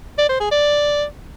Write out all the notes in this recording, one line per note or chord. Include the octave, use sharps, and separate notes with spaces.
D5
C5
G#4
D5